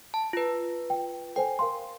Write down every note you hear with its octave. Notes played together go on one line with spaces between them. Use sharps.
A5
F4 B4
G5
A4 C5 G5 G#5
A#4 F5 C6